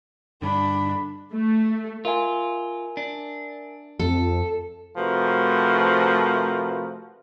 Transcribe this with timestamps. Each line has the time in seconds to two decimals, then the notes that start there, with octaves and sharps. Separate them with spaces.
0.42 G2 D3 D4 B5
1.33 A3
2.05 F4 A#4 E5 G#5
2.97 D4
3.99 F2 A4
4.97 C3 F3 A3 F#4 A#4 B4